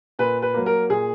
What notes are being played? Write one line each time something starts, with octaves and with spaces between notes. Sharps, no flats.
A#2 B4
B4
F#3 A#3
A#4
A#2 G#4